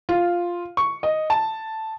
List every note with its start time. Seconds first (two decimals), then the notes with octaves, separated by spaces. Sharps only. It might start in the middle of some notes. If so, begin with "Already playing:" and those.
0.09 F4
0.77 C#6
1.03 D#5
1.30 A5